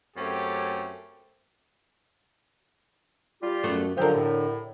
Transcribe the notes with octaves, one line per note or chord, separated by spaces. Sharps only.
F#2 A3 C4 C#4 G4
G3 F4 G4
F#2 A3 B3
D3 F3 F#3 G4 A#4
A2